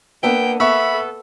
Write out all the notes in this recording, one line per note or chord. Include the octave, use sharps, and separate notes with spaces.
A#3 B3 D4 E5 G5
B3 A4 E5 B5 C#6 E6